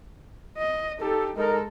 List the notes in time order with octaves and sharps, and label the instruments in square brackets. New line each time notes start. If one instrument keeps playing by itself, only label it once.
[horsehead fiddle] D#5
[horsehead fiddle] D#4 G4 [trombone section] A4
[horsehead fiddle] G#3 A4 [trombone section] D#4 A#4